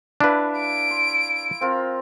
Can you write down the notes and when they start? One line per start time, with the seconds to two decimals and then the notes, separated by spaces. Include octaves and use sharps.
0.20 D4 E4 B4 F5
0.59 D7
0.90 C6
1.61 C4 F4 A#4